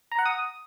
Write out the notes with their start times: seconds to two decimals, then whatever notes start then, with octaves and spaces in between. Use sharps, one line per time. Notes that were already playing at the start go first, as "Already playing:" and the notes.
0.12 A#5
0.19 F#5
0.26 D#6